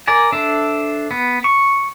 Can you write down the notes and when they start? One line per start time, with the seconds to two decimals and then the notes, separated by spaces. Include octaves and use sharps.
0.08 A#4 D5 G#5
0.32 D4 A4 C5 E5
1.11 B3
1.44 C#6